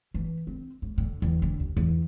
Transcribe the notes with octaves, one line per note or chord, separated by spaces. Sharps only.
E3
C4
G#2
D3
E2
D3
D#2
E2